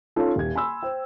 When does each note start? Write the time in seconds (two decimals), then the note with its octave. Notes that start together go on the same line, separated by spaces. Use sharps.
0.16 C#4 D#4 F4 A4
0.36 D#1 G#6
0.55 G#5 B5 C6 E6
0.83 C5 G5